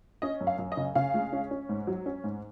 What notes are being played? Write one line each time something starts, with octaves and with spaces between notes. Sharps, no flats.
C#4 D#5
F#2
F5
F#2
D#5
C#3
C#3 F5
G#3
C#4
C#4
G#2
F#3
C#4
G#2